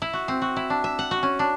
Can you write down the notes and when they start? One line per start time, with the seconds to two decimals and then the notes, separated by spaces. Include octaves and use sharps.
0.02 E4
0.13 F#4
0.28 C4
0.42 F#4
0.57 E4
0.70 D4
0.84 E5
0.99 F#5
1.11 F#4
1.23 C#4
1.39 D4